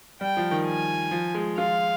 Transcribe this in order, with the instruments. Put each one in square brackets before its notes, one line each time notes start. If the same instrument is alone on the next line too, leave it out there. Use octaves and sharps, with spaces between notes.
[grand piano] G3 [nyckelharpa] G5
[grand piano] F3
D#3
[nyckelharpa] G#5
[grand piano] F3
G#3
[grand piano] F4 [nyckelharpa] F5